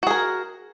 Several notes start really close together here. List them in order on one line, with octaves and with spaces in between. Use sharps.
F#4 G#4 A#4